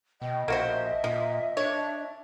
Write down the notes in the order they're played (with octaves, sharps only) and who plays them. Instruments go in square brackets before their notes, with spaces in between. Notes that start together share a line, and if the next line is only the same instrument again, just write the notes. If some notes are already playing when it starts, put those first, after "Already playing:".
[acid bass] B2 [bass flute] D#5 [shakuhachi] G5
[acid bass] A#1 [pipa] A#3 F#4 C5 [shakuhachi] E5
[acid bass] A#2 [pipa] F3
[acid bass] D4 [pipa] C#5